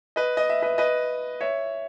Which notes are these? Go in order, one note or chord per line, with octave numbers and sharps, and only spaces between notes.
B4 D#5
D#5
E5
B4 D#5
B4 D#5
C#5 E5